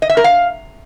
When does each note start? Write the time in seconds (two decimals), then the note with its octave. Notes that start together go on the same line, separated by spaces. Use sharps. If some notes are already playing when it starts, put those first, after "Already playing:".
0.02 D#5
0.10 E5
0.17 A#4
0.24 F5